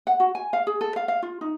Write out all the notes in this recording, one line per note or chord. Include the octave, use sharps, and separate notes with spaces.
F#5
F#4
G#5
F5
G#4
A4
F5
F5
F4
D#4